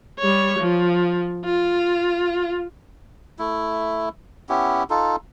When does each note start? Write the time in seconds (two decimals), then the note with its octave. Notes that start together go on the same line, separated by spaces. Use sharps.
0.19 G3 C#5
0.59 F3
1.45 F4
3.39 A3 E4
4.49 B3 C#4 E4 G4
4.90 D#4 F4 A4